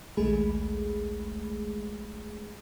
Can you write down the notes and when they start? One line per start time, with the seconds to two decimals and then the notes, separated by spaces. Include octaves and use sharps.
0.17 A#1 D#2 G#3 A3 G#4 B5